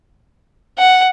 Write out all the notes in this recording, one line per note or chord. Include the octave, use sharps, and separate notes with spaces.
F#5